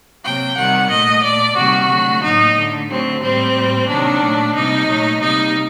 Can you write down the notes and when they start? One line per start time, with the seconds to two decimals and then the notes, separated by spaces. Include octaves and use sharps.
0.24 C3 F#3 A#3 G5
0.57 C3 D#3 G3 F#5
0.90 A#2 A3 D#5
1.23 A#2 A3 D5
1.56 C3 D#3 G3 A#3 F#4
1.89 D3 F#3 A3
2.23 A2 F#3 A#3 D#4
2.57 D3 A3
2.89 D3 F#3 A3 C4
3.22 A2 G3 A#3 C4
3.56 A2 G3 A#3
3.89 C3 D#3 F#3 A#3 D4
4.22 A#2 F#3 A3
4.55 C3 G3 A#3 D#4
4.88 A#2 F#3 A3
5.21 C3 G3 A#3 D#4